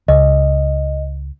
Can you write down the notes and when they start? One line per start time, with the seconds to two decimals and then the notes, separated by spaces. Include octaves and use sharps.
0.08 C#2 D#5